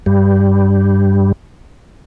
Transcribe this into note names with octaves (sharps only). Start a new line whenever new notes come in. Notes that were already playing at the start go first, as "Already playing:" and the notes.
G2 G3